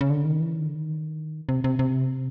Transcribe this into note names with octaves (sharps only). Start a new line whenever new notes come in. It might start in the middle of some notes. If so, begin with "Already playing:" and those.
C#3
D3
D#3
E3
D#3
D3
D#3
C3
C3
C3